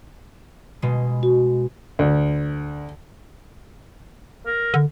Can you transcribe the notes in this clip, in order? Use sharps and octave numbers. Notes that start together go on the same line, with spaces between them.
B2 G#3
F#4
D2
A#4
D3